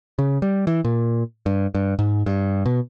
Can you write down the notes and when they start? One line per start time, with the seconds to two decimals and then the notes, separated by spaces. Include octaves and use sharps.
0.19 C#3
0.42 G3
0.67 E3
0.85 A#2
1.46 G2
1.75 G2
1.99 G#2
2.26 G2
2.66 B2